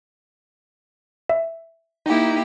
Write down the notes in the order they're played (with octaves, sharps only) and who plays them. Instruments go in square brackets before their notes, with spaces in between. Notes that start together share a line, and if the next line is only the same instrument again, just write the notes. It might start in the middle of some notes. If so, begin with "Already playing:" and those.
[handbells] E5
[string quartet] A#3 E4 G4 [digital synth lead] D#4